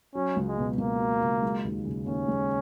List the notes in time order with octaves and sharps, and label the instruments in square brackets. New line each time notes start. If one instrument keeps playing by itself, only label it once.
[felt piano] F#3 [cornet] C#4
[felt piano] C#2
[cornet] G#3
[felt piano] B2
[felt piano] C#2 [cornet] A#3
[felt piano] F#3
C#2
G#3
D#2
C#3
[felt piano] D#2 [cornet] C#4
[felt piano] G#3